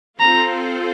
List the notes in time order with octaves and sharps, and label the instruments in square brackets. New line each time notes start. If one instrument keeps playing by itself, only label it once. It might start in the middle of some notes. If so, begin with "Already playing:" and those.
[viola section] C4 F4 A4 C5 [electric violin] A#5